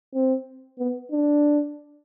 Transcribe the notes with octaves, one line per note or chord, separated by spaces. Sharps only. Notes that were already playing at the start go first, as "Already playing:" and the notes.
C4
B3
D4